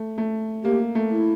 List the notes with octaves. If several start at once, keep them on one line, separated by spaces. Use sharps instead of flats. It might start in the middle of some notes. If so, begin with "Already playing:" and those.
Already playing: A3
A3
A#3 G4
A3
E4